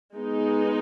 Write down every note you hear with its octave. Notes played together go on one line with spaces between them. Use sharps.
G#3 B3 D#4